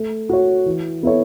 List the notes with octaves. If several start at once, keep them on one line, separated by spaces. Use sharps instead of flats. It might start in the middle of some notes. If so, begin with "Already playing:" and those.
Already playing: A3
F#4 C#5
E3
B3 E4 A4 C#5